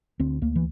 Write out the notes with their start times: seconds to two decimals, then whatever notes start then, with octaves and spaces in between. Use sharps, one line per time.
0.20 D2 C4
0.42 D2 A#3
0.56 E3